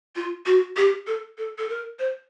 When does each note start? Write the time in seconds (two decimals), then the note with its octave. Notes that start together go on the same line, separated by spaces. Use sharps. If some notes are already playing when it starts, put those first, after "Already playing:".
0.16 F4
0.46 F#4
0.77 G4
1.07 A4
1.38 A4
1.58 A4
1.69 A#4
1.99 C5